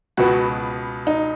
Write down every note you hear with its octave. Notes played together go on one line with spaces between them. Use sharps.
C#2 B2 B3 F#4
D#4